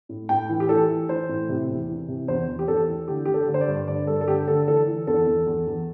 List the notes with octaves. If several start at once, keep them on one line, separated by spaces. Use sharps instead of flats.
A2
A2 G5
E3
G4
E3 A4
E3
E3 C5
A2
C3
E2
E3
C3
E2 C5
E2
G4
E2 A4
E3
D3 G4
D3 G4
A4
D3
C5
D5
G2
D3 D5
G2 A4
A4
D3 G4
D3 A4
E3 A4
E3
E2 A4
E2
E2
E2